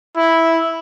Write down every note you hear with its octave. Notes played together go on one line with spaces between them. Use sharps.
E4